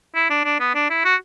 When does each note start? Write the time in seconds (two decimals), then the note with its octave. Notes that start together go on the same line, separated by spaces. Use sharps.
0.15 E4
0.30 D4
0.45 D4
0.60 B3
0.75 D4
0.90 E4
1.05 F#4